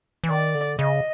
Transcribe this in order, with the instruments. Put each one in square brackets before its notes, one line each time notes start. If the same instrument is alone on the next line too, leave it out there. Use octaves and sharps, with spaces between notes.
[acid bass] E3
[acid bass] D#3 [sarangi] D5
[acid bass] D3
[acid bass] C#3 [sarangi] D#5